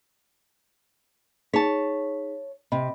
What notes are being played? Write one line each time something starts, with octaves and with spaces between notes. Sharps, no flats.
D#4 G#4 C#5 A5 B6
C3 D#5 B5